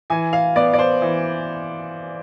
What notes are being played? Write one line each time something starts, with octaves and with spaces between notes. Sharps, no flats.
E3 G#5
F5
B3 D5
D5
C5
E3